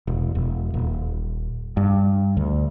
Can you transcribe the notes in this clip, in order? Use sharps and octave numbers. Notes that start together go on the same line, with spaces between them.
E1
E1
D#1
G2
D2